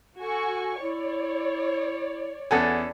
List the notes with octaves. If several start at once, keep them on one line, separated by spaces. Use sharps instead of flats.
F#4 A4 G#5 C#6
E4 C#5 D5
E2 C#4 A4 D5 F#5 G#5